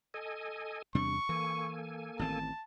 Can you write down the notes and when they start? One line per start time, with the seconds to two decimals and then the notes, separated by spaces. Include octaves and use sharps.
0.14 A4 D#5 G#5
0.95 E2 C3 G3 D4 C#6
1.29 E3 A#3 A4 G#5
2.19 A1 D#3 C4 A5